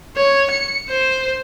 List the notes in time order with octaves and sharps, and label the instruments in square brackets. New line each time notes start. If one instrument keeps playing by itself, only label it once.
[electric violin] C#5
C#7
C5